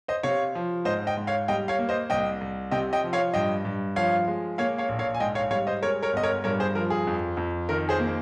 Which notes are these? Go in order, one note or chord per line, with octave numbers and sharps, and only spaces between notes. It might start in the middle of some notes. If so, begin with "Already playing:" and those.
C5 D#5
C3 C#5 F5
F3
G#2 C5 D#5
D#5 G5
G#2
C#5 F5
G3 D#5 G5
C#5 F5
A#3
C5 D#5
C2 D#5 G5
C2
C3 D#5 G5
D#5 G5
F3
C#5 F5
G2 D#5 G5
G2
F3 C#5 F5
G#3
A#3 C#5 F5
C#5 F5
A#1
C#5 F5
G#5
G#2 D#5 G5
C#5 F5
G3 C#5 F5
C5 D#5
G#3 A#4 C#5
A#4 C#5
G1 D#5
A#4 C#5
G2 A#4 C#5
G#4 C5
F3 A#4
G#4
F2
F2
D#3 A#4
G#4 C5
A#3